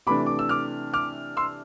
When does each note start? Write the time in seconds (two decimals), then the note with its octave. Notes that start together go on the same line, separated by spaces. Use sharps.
0.07 C3 E3 A3 D4 B5 D6
0.26 D6
0.39 E6
0.49 D6 F6
0.93 D6 F6
1.37 C6 E6